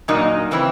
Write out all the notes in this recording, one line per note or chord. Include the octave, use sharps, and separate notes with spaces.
A#2 F#3 A#3 D#4
C#3 E3 C4 E4